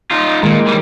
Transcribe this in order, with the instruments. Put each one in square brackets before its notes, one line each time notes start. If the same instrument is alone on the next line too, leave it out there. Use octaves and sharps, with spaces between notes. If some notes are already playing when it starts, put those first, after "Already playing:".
[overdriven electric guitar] D#4 F4
[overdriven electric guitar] A#2 [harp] D#3 [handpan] G#3
[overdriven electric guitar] E3 G3